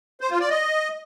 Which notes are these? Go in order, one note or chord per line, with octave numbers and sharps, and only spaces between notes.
C5
F4
D5
D#5